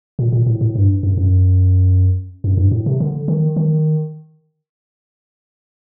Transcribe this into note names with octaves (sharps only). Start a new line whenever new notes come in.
A#2
A#2
A2
A2
G2
F#2
F#2
F#2
G2
A2
C3
D3
D#3
D#3